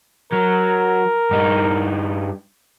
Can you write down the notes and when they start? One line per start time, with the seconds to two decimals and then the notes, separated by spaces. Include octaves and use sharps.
0.32 F#3 A#4
1.31 G2 D#4